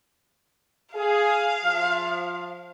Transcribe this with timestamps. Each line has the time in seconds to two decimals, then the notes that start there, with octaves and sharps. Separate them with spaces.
0.95 G#4 F5
1.64 F3